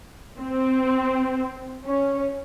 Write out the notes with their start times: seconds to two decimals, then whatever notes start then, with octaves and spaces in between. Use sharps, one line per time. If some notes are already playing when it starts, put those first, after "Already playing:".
0.39 C4
1.85 C#4